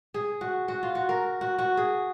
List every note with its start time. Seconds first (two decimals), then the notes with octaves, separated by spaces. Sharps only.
0.14 G#4
0.41 F#4
0.68 F#4
0.83 F4
0.95 F#4
1.09 A#4
1.41 F#4
1.59 F#4
1.77 G#4